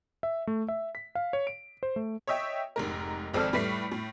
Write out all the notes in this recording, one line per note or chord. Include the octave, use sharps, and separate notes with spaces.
E5
A3
E5
B6
F5
C#5
D7
C5
A3
C#5 D#5 E5 G5
F1 G#2 A#4
G#1 F2 C4 A4 D5 F6
A2 G3 A3 B4 B6 C7
A2